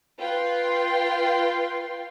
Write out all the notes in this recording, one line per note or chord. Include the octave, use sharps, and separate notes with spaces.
F4 B4 G5 C6